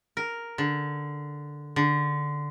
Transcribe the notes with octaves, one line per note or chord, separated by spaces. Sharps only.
A#4
D3
D3